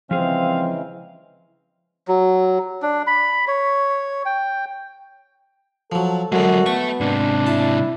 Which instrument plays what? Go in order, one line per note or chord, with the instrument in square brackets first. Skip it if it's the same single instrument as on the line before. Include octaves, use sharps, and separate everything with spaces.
[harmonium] C#3 E3 G#3 [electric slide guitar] F3 G#4 [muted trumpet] C4 [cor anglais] F5
[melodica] F#3
D4
B5
C#5
G5
[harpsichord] F3 F#3 [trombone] A4
[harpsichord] F#2 D3 [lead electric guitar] F#3 G#3 [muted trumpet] F#4
[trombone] B3 [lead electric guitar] E5 A5 [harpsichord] C#6
[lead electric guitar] G#2 C3 [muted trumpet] D4
[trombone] E4 [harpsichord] A5